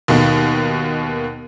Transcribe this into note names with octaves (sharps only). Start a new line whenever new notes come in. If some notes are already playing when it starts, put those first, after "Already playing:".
D#2 B2 D#3